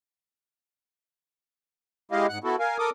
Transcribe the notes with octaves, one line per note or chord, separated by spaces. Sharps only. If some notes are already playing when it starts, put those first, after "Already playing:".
G#3 E4 G4 D#5 F5
G#2 F#5 F#6
B3 E4 F#4 A4
A#4 F5 G#5
A4 A#4 D6 D#6